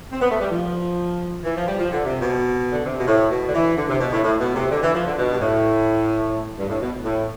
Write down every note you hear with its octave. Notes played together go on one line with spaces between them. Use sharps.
C4
B3
A3
G3
F3
E3
F3
G3
F3
D3
C3
B2
D3
C3
B2
A2
B2
D3
E3
D3
C3
B2
A2
A2
B2
C3
D3
E3
F3
D3
B2
G2
A2
G2
A2
B2
A2